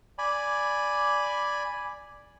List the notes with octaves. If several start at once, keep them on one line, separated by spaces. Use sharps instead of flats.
D5 G#5 B5